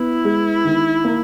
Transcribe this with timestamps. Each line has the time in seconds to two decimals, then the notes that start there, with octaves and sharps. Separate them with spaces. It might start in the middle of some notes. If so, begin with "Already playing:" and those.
Already playing: B3 E4
0.25 G#3
0.64 D#3
1.05 A#3